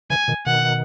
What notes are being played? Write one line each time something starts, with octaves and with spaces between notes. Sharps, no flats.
C#3 E3 G#5
B2 D#3
B2 D#3 F#5